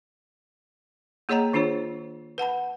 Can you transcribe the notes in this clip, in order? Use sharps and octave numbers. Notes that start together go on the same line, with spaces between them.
A#3 G#4 C#5 D#5 G5 A#5
D#3 D4 F4 G#4 C#5
B4 F#5 A5 B5